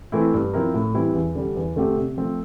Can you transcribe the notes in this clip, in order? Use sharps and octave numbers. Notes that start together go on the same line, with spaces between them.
E3 A3 C4 E4
G2
F3 C4 E4 A#4
A2
E3 G3 C4 E4
E2
D3 G3
E2
D3 A3 C4 G4
C3
F3 A3 C4